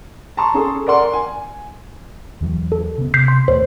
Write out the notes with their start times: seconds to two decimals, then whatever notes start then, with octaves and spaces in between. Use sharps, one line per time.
0.37 A5 A#5 C6 C#6
0.54 C#4 G#4 A4
0.87 A#4 D5 F#5 C6
1.13 G#5
2.41 E2 E3 F#3
2.72 A4
2.98 C#3 B3
3.14 C3 G6 B6 C7
3.28 C6
3.48 D#2 A#2 A3 C5 C#5